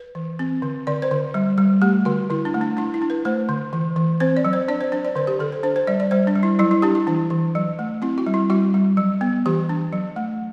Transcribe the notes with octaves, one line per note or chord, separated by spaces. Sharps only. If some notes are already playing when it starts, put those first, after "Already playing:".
Already playing: B4
E3
C4
D3
D3 D5
C5
D3
G3
G3
A3 G4
D3 F#4
D3 E4
D4
A3
D4
D4 E4
E4
D4
B4
A3 C5
D3
E3
E3
C4 C5
D5
F#3
C5
D4 D5
C5
D4 C5
D5
D3 C5
G4
D3 A4
C5
D4 C5
C5
G3 D5
D5
G3 C5
D4
G3
E4
F#3 E4
E4
D4 G4
E4
E3 D4
E3
F#3
A3
C4 E4
F#4
G3
E4
G3 F#4
G3
F#3
B3
E3 G4
D4
F#3
A3